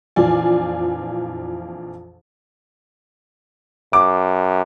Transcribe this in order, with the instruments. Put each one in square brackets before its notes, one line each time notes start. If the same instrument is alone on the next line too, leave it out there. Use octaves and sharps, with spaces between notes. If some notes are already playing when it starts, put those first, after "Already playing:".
[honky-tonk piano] A#1 F2 E3 F4 D5 G#5
[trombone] F#2 [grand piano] D6